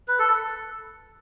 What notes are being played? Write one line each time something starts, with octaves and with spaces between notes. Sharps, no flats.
B4
A4